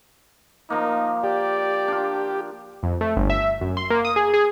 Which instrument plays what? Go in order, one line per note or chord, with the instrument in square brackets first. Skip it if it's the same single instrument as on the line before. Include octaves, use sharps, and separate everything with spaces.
[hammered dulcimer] F3 A#3 [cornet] D#4
[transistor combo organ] G4 [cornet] D5
[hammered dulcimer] D4 F4
[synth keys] F2
A3
G1
E5
F#2
C6
A#3
D#6
G#4
G#4